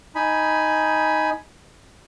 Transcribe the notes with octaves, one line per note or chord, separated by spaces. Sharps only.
D#4 G#5 B5